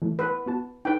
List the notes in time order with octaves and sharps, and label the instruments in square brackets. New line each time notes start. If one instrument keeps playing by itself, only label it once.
[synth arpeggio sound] E3 A3
[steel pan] B4
[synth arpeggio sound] B3 F#4 A5
[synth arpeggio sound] D#4 A4 B4 [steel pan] G5